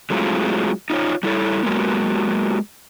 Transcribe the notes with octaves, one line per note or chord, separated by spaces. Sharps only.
F#3 G#3 A3 C4 E4 F4
D#4 F4 B4 C#5
G3 E4 A4 C#5
F#3 G#3 A#3 B3